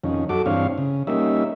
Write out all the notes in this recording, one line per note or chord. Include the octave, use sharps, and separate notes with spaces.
F2 D#3 C#4
F#2 F#4 A4 D6
G2 E3 C4 D4 C#5 F5
C#3
G3 A#3 C#4 D#4 E5